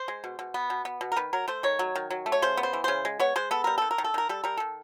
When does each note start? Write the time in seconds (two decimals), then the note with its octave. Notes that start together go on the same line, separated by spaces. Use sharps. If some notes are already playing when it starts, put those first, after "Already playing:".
Already playing: C5
0.08 G#3
0.24 B2
0.39 B2
0.54 B3
0.70 B2
0.85 B3
1.01 B2
1.12 A#4
1.16 D#3 B4
1.33 F#3 A#4
1.48 A3 C5
1.63 D#3 C#5
1.79 F#3
1.95 D#3
2.10 F#3
2.26 A3
2.32 C#5
2.42 C#3 C5
2.57 B3
2.63 C5
2.73 E3
2.84 C#3 C5
3.05 G#3
3.20 B3 C#5
3.36 G#3 C5
3.51 B3 A4
3.64 G3 A#4
3.78 D#3 A4
3.91 A#4
3.98 D#3
4.04 A4
4.14 D#3 A#4
4.29 G3 A4
4.44 G3 A#4
4.57 D#3 A4